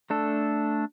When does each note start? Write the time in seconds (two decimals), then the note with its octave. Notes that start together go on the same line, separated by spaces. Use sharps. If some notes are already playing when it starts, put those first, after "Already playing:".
0.10 A3 D4 A4